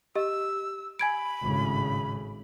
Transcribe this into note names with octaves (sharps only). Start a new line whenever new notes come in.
G4 D#5 E6
G#5 B5 G#6 D7
G#1 A2 C#3